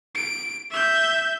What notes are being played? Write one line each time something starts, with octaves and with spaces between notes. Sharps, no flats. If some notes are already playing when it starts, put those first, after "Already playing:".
D7
E5 G6